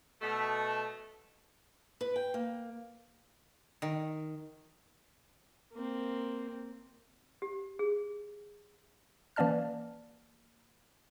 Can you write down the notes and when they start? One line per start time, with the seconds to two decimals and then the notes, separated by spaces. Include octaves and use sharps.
0.22 B2 A3
2.01 B4
2.16 G5
2.34 A#3
3.82 D#3
5.74 A#3 C4
7.42 G4
7.79 G#4
9.36 E3 A#3 C#4 D5 A5 F6